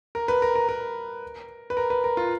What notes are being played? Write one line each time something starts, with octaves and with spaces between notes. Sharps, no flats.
A#4
B4
A#4
A#4
A#4
B4
A#4
B4
A#4
F4